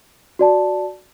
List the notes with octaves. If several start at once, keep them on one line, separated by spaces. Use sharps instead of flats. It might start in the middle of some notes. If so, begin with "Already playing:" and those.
F#4 D5 A5